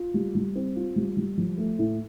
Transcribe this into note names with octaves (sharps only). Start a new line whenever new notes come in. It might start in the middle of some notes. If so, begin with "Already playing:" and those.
Already playing: F4
G3
G3
C4
F4
G3
G3
F3
A3
A2